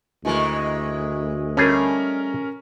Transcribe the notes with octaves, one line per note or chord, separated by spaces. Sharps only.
D2 D#3 E3 G#3
G3 A3 C#4 G#4 A#4